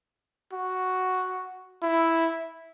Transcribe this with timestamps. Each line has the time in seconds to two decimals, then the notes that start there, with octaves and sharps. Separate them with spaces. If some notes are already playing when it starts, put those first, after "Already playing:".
0.53 F#4
1.83 E4